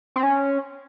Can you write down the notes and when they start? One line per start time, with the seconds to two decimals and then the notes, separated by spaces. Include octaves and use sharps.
0.16 C4
0.23 C#4